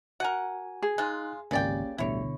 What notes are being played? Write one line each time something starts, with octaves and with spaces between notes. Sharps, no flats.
F#4 A#4 F#5 G#5
G#4
G#3 D#4 F4 F#6
G#1 C#2 C#3 A#3 C#4 G4 D5 G5
A1 D2 B2 D3 G3 E4 C#5